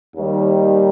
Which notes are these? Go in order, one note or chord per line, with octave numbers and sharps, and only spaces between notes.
D#2 D#3 G3